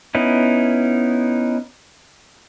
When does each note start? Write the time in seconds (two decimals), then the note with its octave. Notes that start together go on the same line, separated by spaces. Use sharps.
0.15 B3 C#4 D#4 E4